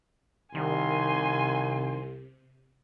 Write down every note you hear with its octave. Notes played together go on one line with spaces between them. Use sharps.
C2 C3 D#3 G#5 C6